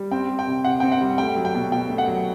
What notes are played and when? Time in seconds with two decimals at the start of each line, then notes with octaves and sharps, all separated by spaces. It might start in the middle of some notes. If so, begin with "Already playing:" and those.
Already playing: G3
0.11 C4 G5
0.29 G3
0.39 G5
0.47 C3
0.65 C3 F#5
0.80 C4 G5
0.92 F#5
1.01 G3
1.18 A3 G5
1.36 F#3
1.45 G5
1.55 B2
1.72 B2 G5
1.89 A3
1.98 F#5
2.07 F#3